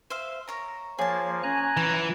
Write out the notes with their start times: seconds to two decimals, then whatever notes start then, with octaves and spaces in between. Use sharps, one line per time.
0.10 C5 E5 F5
0.48 A#4 C#5 A#5
0.99 F3 A#3 G#4 C#5 A5
1.43 C#4 G#5 A#5 F#6
1.77 E3 F#5